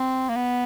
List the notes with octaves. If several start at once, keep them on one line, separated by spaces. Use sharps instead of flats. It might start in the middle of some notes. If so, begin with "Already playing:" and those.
Already playing: C4
A#3
B3